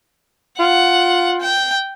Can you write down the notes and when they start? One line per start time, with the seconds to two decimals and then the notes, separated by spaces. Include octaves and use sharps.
0.59 F4 F#5
1.41 G5